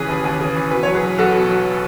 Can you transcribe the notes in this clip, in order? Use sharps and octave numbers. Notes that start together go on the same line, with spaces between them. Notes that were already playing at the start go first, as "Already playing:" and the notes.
Already playing: C#3 E3 G#4 B4
D#2
D#2
C#3
E3
B2 B4
F#3 C#5
G#4 B4
B1
B1 F#4 A4
B2
F#3